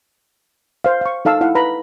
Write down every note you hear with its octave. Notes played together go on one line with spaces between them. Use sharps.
C5 F5
F5 C#6
D#4 A4 F5 A5 E6
E4 F5 F#5
B4 A#5 B5